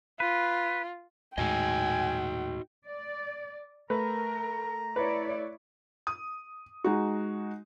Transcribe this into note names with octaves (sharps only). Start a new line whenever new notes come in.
F4 B4
D#2 A2 G#3 D#4 F#4 D#5 G5 G#5
D5
A3 A#4 B4 A#5
E4 B4 C#5 D5
D#6
G#3 D#4 F#4